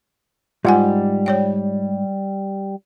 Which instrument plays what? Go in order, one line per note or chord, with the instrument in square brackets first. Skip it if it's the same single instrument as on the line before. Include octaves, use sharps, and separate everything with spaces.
[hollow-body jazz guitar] G#2 [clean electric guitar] G3 [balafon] F4 F#5 G#5
[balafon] C#5 D5 G5